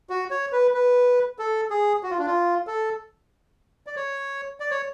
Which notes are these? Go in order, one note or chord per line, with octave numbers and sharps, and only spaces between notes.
F#4
C#5
B4
B4
A4
G#4
F#4
F4
D4
F4
A4
D5
C#5
D5
C#5